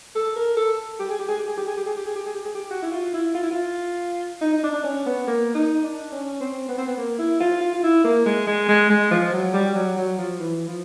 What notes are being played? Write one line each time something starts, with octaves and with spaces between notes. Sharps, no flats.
A4
A#4
A4
G4
G#4
G4
G#4
G4
G#4
G4
G#4
G4
G#4
G4
G#4
G4
G#4
G4
G#4
G4
F#4
E4
F4
E4
F4
E4
F4
D#4
D#4
D4
D4
C#4
B3
A#3
D#4
D4
C#4
C4
B3
C4
B3
A#3
E4
F4
F4
F4
E4
A#3
G#3
G#3
G#3
G#3
F3
F#3
G3
F#3
F#3
F3
E3
F3